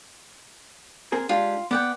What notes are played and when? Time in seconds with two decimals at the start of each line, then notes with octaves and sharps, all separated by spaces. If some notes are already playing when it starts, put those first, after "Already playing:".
1.12 C4 G#4 A#4
1.29 G#3 D4 F4 G4
1.71 B3 D5 F#5 G5